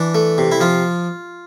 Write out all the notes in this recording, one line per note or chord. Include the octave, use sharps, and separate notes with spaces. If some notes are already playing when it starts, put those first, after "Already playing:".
Already playing: E3 D4
A3
C3
E4
F3 F4